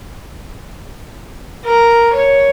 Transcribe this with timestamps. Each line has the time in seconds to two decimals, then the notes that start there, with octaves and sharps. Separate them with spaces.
1.65 A#4
2.13 C#5